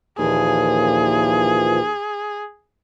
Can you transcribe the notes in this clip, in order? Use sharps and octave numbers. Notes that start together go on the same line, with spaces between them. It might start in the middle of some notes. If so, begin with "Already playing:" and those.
D#2 A#2 E3 F3 G#4